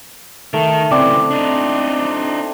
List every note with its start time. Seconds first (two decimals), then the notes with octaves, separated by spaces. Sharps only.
0.53 D#3 A3
0.91 C#3 E3 C4 D5
1.31 D4 D#4